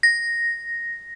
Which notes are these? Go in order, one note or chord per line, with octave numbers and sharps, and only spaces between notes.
A#6